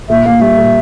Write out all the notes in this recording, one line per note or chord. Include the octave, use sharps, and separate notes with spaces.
A#2 E5
A#3 F5
G3 E5
A#2